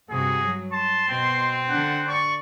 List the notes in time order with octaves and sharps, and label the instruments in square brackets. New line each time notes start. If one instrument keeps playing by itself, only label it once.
[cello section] G2 C3 F#4 [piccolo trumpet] G#4
[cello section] F#3
[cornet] A5 [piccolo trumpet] C6
[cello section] B2 [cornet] C4
[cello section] D3 D4 [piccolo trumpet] F#5
[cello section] D5 [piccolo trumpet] C#6